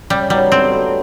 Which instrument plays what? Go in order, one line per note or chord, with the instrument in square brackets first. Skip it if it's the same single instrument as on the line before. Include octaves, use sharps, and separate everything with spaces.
[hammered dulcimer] C#3 [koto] G3
[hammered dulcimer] F#3 B3 D#4 [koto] G3
[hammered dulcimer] D3 [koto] C4
[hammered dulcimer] F#3 A3